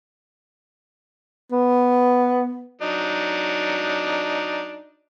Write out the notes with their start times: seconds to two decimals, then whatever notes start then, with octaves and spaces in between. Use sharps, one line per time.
1.52 B3
2.81 F#3 D4 D#4